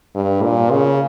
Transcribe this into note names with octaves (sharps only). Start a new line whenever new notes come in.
G2
A#2
C#3